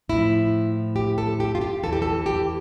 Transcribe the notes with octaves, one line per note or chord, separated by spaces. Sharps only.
A2 F3 E4
G4
A4
G4
F4
G4
E2 E3 A4
G4
A4
G4